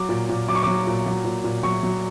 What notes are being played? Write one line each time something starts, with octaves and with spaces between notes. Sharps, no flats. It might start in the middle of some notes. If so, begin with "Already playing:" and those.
Already playing: F#3 D6
A#2
A#2
F#3 D6
C#6
F#3 D6
A#2
F#3
A#2
A#2
F#3 C#6
F#3